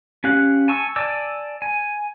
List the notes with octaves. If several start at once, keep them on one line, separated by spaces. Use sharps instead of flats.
C#4 G4 F5 F#6
G#5 A5 C#6 E6
D5 G#5 A5 D6 E6
G#5